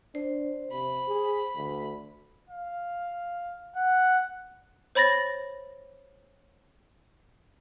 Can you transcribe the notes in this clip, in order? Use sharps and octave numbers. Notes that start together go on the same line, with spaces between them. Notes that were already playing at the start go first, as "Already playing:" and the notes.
D4 C5
C3 B5
G#4
D2
F5
F#5
C5 C#5 B5 A6 A#6